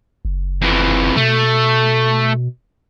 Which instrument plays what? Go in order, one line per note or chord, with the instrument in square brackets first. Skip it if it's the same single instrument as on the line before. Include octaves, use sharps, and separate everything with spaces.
[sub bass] F#1
[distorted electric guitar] F2 E3
[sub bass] B2 [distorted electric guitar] A3